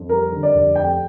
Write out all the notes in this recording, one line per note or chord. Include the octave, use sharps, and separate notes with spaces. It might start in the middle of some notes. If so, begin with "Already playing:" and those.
Already playing: F2
G3 A#4
D3
D5
F1
F2 G5